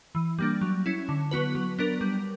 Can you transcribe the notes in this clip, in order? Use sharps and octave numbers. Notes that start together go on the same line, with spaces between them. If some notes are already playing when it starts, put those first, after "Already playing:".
E3
G3 A#3 D4
F#3
C#4 E4
D3
F#3 B3 F#4 B4
F#3
B3 D4 A#4
G3